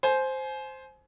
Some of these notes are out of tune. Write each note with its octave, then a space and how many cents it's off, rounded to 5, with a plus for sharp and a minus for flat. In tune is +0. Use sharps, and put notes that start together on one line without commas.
C5 +0 G#5 +30